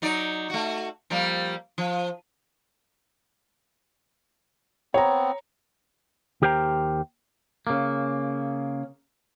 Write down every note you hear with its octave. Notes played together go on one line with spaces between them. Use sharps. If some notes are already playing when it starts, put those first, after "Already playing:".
F#3 D#4 D5
A3 F#4
F3 G3 A#3
F3
B3 C4 C#5 A#5
D#2 G4 A#4 C5 G5 A#5
C#3 A#3